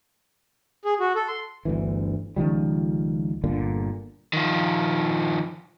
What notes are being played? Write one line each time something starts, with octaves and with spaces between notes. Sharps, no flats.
G#4
F#4
A4
C6
G1 D2 E3
C#2 D#3 F3 G3
G1 A#2 D3
D#3 F3